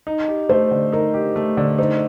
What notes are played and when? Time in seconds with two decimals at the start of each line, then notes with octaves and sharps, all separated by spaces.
0.07 D#4
0.28 G4
0.49 A3 C5
0.71 D3
0.92 D#4 A#4
1.14 G4
1.36 A3
1.57 D3
1.78 D#4 C5